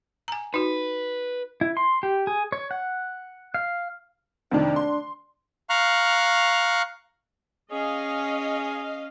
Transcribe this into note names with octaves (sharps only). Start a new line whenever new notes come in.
G#5 A#5
D#4 F#4 B4
E4
C6
G4
G#4
C#5
F#5
F5
F2 C3 D#3 D4
C6
F5 A#5 C#6 F6 F#6
C#4 G#4 D#5 F5